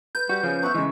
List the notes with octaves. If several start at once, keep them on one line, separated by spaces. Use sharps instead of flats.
B4 G6
G3 F#4
C#3 F3 C#4
B3 E5 C#6
C#3 E3 G#3